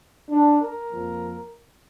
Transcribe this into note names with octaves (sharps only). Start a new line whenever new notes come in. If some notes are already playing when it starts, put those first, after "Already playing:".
D4
A#4
F2 F3 A#3